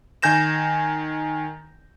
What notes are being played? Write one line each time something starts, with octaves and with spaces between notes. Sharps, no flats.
D#3 G#5 G6 A#6 E7